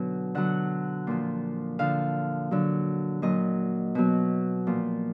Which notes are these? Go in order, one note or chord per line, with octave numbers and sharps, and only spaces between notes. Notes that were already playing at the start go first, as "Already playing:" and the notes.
Already playing: B2 D3 F#3
D3 F#3 F#5
A#2 F3
D3 F3 F5
D3 F#3
A#2 F#3 D#5
B2 F#3
A#2 F3